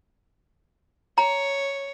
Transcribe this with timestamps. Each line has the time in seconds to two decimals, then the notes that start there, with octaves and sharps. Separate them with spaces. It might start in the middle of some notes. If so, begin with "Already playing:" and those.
1.18 C#5 A#5